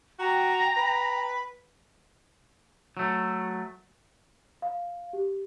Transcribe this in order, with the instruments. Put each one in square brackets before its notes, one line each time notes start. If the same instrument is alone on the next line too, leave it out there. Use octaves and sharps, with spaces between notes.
[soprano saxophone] F#4 [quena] G5 [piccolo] A#5
[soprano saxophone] B4
[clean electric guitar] F#3 A3
[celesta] F5
G4